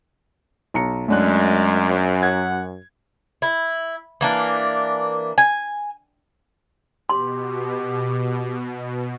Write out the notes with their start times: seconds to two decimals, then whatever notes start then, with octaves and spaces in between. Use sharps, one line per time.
0.74 B1 A#5 C#7
1.08 F#2 G#3 A3 D4 F#6
2.23 F#5 G#6
3.42 E4
4.21 E3 A#3 D4
5.38 G#5
7.09 B2 G4 C6